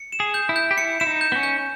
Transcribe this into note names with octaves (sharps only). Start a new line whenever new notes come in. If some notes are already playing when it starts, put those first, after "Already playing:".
Already playing: C#7
E7
G#4
G6
E4
G6
G4
E4 C#7
E4 E7
D#4
G6
B3
C#4
G6